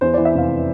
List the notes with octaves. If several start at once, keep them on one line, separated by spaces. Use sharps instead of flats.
E2 C5
D5
E3
E5
F1 F5